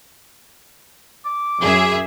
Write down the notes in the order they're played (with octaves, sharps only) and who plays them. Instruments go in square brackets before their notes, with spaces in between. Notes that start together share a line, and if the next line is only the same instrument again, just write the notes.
[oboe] D6
[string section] F#2 G#4 E5